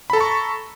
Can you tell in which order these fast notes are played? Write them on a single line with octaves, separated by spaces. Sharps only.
B5 A4 A#5 C#6